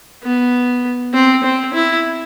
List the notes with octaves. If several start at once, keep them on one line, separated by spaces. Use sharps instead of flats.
B3
C4
C4
E4